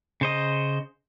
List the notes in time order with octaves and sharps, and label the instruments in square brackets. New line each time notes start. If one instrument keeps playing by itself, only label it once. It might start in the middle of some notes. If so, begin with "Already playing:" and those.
[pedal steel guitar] C#3 C5 D#5